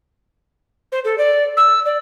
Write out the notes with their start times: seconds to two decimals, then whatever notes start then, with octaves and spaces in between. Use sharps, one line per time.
0.92 C5
1.04 A4
1.18 D5
1.57 E6
1.85 D5